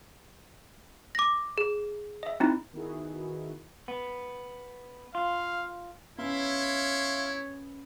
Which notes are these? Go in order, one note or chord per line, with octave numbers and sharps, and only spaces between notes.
D6 A#6
G#4
D#5 E5
C4 D#4 E4
D#3 B3 D#4 E4 F#4 G#4
B3
F4 F5
B3 C#4 E4 C#5 E5 F5 C6